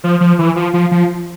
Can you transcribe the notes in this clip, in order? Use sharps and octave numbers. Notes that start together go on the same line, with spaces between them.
F3
F3
E3
F3
F3
F3